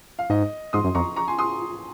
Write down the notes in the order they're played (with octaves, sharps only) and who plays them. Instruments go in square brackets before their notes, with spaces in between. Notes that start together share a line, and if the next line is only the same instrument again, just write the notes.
[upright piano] F5
[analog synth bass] G#2 [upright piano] D#5
[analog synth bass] G#2 [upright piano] C6 D#6
[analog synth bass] F#2
[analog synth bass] F2 [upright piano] A#5 C#6
[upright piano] A#5 C#6
G#5 C6
C6 D#6